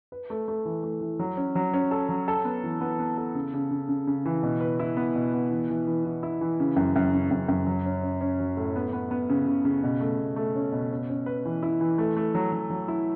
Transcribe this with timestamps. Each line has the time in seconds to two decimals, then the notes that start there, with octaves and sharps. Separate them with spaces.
0.12 B4
0.30 A3
0.48 A3
0.65 E3
0.83 A3
1.01 E3
1.19 F#3
1.37 C#4
1.55 F#3
1.74 C#4
1.91 A4
2.09 F#3
2.28 A4
2.45 B3
2.63 E3
2.81 B3
2.99 B3
3.18 A4
3.35 C#3
3.54 C#3
3.71 C#3
3.89 C#3
4.07 C#3
4.25 E3
4.43 B2
4.61 B4
4.79 E4
4.97 B3
5.15 B2
5.33 B3
5.51 E3
5.70 E3
5.87 E3
6.05 E3
6.23 E4
6.41 E3
6.60 C#3
6.76 F#2
6.96 F#2
7.13 C#3
7.31 F#2
7.48 F#2
7.66 F#3
7.86 C#4
8.03 C#4
8.21 C#4
8.40 F#3
8.57 A2
8.76 B3
8.93 B3
9.11 B3
9.29 C#3
9.47 C#3
9.65 C#3
9.83 B2
10.00 A3
10.19 B2
10.36 A3
10.55 C#4
10.72 B2
10.91 C#4
11.09 C#4
11.26 B4
11.45 E3
11.63 E4
11.81 E3
11.98 A3
12.17 A3
12.35 F#3
12.52 F#3
12.70 F#3
12.88 E4